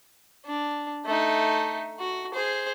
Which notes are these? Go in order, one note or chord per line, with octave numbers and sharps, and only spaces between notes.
D4
A3 D#4
F#4
G#4 C5